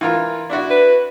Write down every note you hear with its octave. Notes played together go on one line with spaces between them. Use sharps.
E3 F4 A#4
D4 E4 F#4
B4